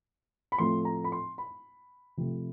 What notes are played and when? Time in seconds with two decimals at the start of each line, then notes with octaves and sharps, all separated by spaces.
0.52 B5
0.58 A2 F3 A3 C4 C6
0.85 A#5
1.04 B5
1.12 C6
1.38 B5
2.17 C3 F3 A3 C4